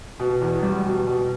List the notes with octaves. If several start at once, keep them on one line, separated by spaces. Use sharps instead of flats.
B2
E2
G3
B2
B2